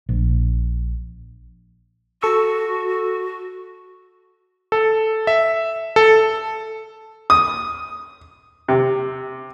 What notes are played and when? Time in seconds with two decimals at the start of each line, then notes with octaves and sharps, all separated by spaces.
0.09 A#1
2.22 F#4 A4 C#6 E6
4.72 A4
5.27 E5
5.96 A4
7.30 D#6
8.68 C3